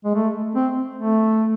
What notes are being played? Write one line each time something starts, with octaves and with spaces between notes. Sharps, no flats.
G#3
A3
C4
A3